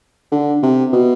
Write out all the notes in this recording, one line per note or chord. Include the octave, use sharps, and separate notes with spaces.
D3
C3
B2